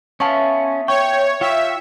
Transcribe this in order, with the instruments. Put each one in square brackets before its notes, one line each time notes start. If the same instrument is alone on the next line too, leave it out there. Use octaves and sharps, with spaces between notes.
[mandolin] B3 E4 F4 [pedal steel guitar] C#4 [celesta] A5 C#6
[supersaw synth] C#5 [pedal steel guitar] G5 [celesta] C#6
[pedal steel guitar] F4 C#5 [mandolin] G4 [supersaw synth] E5